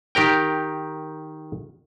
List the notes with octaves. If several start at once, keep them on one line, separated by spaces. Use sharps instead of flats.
D#3 G4 A#4 G5